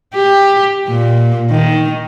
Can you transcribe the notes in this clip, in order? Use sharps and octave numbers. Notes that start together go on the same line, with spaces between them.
G4
A#2
D#3